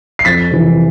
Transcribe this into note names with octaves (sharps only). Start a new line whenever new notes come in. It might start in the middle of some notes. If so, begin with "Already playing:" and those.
C7
F2 A6 B6
C3 E3